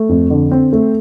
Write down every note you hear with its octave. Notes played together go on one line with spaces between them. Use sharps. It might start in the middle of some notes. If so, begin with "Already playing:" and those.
Already playing: A3
F2
D3
C4
A3